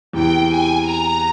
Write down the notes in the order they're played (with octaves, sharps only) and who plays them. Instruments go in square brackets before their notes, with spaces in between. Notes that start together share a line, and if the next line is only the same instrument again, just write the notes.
[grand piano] E2 C3 E3 [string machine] G5
[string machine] G#5
A#5